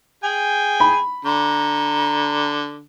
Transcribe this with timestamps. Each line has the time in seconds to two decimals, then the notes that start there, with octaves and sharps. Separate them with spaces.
0.24 G#4 G5 G#5
0.80 B5
1.25 D3 A#5